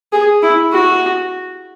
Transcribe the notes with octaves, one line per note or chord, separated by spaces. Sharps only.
G#4
E4
F#4